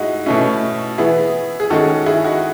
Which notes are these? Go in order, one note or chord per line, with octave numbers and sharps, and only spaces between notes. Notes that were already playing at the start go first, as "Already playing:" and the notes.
Already playing: A2 G#3 D#4 E4 F#4
B2 A3 C#4 E4
E3 B3 E4 G#4
G#4
D#3 G#3 C#4 F#4 A4
E4 G#4
D#4 F#4